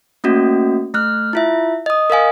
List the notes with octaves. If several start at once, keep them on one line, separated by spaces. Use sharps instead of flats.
A3 A#3 C#4 F#4
A3 F6 F#6
E4 F4 E5
D#5 D#6
A#4 D#5 F5 G#5